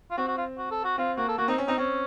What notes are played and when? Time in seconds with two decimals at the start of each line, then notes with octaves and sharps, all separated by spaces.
0.11 F4
0.17 C4 F#4
0.28 F#4
0.37 F4
0.58 F#4
0.71 A4
0.84 F#4
0.98 C4 F4
1.17 A#3 F#4
1.28 A4
1.38 A#3 F#4
1.48 C4 D#4
1.58 C#4
1.67 C4 D#4
1.78 C4 C#4